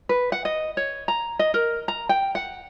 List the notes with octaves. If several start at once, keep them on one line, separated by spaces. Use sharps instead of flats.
B4
F#5
D#5
C#5
A#5
D#5
A#4
A#5
G5
F#5